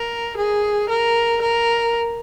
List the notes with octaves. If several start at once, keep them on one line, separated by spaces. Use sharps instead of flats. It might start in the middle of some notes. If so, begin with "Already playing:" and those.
Already playing: A#4
G#4
A#4
A#4